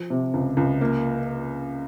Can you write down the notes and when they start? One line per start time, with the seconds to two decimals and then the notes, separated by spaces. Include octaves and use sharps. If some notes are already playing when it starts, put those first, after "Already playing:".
Already playing: F3
0.10 C3
0.34 C#2
0.57 C#2
0.81 A#3